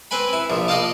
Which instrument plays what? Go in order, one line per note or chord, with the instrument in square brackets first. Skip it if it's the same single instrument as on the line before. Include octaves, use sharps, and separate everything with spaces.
[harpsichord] C4 B4 G5 G#5 B5
E4
A#1 F3
D5 D#5 F5 G5 A5